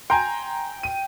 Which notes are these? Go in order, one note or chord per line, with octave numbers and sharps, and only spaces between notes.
G5 G#5 A#5 C6
D#7